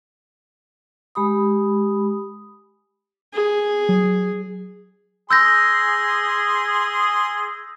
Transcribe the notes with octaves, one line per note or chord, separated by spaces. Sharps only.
G#3 G4 B5 D#6
G#4
F#3
G#4 C6 E6 G6 A#6